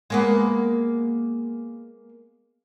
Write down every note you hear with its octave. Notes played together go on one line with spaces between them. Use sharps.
G#3 A#3 B3